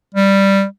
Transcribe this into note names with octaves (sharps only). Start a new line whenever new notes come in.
G3